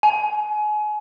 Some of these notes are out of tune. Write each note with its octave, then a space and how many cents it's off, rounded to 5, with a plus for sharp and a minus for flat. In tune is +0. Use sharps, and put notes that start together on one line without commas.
G#5 +30